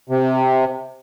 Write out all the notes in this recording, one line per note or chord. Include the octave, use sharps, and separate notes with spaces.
C3